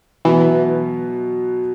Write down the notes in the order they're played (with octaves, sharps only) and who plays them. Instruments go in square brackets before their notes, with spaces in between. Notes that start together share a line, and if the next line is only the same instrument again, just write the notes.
[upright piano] B2 F#3 B3 [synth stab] E3